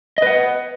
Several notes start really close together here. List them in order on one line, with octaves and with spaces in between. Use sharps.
D#5 B4 F#5